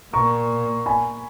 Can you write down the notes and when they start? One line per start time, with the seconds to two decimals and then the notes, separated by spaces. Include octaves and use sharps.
0.13 A#2 A#5 C#6
0.86 G#5 B5